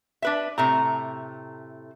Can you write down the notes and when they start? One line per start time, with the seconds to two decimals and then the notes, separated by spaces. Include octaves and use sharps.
0.22 D4 B4 E5
0.58 A2 C3 A3 A#5